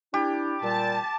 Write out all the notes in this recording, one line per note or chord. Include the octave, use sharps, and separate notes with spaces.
D4 E4 G4
A#2 G3 A5